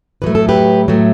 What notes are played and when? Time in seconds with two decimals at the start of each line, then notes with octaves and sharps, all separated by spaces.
0.22 A2 F#3 A3 B4
0.35 A4
0.49 G4 B4
0.88 A2 F#3 A3